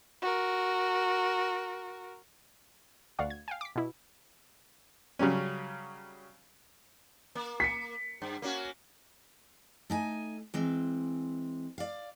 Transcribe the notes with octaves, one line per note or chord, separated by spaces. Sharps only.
F#4 A#4
D2 D5 F5 F#5 C#6
G#6
F5 G5 G#5
D6 B6
B2 E4
C#3 F#3 G3 C#4
A#3
B6 C#7
G2
A#3 C#4 F#4
A3 D#4 G#5
E3 G#3 C4
D5 F5